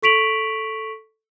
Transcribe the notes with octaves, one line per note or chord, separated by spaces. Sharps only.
A4 C#6 B6 D7 F7 F#7